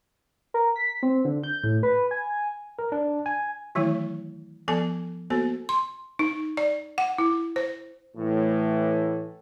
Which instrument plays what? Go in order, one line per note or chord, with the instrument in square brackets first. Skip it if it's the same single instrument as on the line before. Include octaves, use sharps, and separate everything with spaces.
[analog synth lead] A#4
B6
C4
D3
G6
A2
B4
G#5
[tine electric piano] A#4
D4
G#5
[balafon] D#3 E3 F#3 A3 E4
F3 B3 A4 G#5 A5
A#3 B3 F#4 A4 C5
C6
D#4
D5
F#5
E4
C5
[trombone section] A2 E3